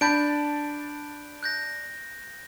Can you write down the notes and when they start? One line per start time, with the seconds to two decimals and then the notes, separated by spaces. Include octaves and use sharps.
0.01 D4 A5 B5 G6 D7
1.43 F#6 G6 A#6